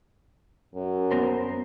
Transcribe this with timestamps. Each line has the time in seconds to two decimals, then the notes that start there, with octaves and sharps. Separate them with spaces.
0.74 F#2
1.11 B3 A#4 C5